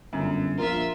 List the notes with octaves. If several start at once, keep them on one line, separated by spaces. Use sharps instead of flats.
G1 F#2
A#1 F4 A#4 E5